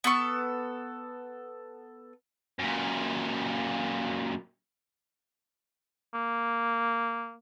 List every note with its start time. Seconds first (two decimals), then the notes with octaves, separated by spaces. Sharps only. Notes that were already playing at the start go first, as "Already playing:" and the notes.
0.04 B3 A4 C#6
2.59 F#2 A#2
6.14 A#3